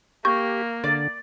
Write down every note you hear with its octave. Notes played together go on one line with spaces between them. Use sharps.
A#3 G4 C#6 G6
D3 D5